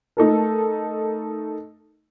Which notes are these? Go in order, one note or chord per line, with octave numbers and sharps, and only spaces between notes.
A3 D#4 A4 A#4